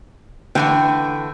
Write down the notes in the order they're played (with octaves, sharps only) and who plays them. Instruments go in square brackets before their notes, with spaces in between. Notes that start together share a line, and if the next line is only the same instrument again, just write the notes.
[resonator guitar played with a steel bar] D3 E3 A3 [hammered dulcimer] G5